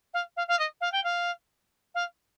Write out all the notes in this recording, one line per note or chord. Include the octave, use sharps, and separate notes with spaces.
F5
F5
F5
D#5
F5
G5
F5
F5